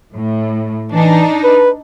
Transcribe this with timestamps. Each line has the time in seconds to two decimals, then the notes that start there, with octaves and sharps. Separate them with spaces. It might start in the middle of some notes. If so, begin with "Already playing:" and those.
0.14 A2
0.92 E3 D4 D#4
1.44 B4